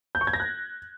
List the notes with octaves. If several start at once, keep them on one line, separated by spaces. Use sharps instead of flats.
G6
C#6
G#6
A#6
F#6